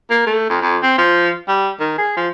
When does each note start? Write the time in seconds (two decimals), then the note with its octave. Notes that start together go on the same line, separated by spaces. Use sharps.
0.10 A#3
0.26 A3
0.49 F2
0.61 F2
0.82 C4
0.98 F3
1.48 G3
1.80 D#3
1.98 G#4
2.17 F3